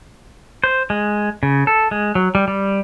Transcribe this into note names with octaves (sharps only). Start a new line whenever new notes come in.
C5
G#3
C#3
A4
G#3
F#3
G3
G3